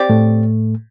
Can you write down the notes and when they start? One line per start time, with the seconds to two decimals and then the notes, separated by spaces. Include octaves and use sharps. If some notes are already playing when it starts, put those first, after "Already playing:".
Already playing: C4 G4 D5
0.10 A2 A3